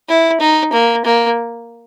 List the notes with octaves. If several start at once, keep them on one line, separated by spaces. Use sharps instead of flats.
E4
D#4
A#3
A#3